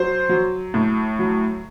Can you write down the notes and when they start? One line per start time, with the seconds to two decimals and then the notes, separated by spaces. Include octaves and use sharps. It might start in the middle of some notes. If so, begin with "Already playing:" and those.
Already playing: F#3 C5
0.29 F#3
0.74 A2
1.19 F#3